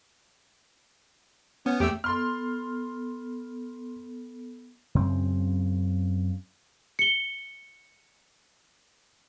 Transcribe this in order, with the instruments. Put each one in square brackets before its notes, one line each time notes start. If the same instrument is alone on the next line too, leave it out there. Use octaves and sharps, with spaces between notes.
[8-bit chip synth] B3 [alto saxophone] C#4
[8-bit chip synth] E2 A3 E6 [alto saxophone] G4
[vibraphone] B3 A4 [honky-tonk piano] C6 F6
[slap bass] F#2 C#3 C4
[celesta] C#7 G7